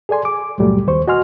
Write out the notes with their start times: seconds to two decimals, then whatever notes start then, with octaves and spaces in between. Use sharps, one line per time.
0.09 G#4 A4 D5 G#5 C6
0.25 D6
0.58 C#2 G2 A#2 F#3 G3 A3
0.87 D#2 C5 C#6
1.08 F#4 D#5 G#5 C6 F6